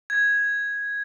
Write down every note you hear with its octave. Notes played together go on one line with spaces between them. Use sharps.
G#6